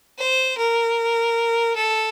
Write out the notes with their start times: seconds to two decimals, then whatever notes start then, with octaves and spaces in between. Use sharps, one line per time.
0.18 C5
0.58 A#4
1.76 A4